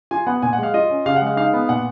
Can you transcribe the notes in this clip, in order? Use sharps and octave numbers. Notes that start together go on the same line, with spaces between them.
F4 G#5
B3 F#5
A#2 G#5
F#5
G#3 F5
F4 D#5
C#4
C#3 F5
F#5
G#3
F5
D#4 F5
B3
A#2 F#5